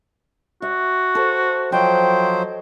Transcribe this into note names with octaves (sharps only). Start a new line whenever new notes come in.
F#4 E5
A4 C5
F3 F#3 C5 D#5 G5